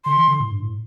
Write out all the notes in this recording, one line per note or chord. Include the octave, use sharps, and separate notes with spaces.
D3 C6
E3
D3
A2
G2
A2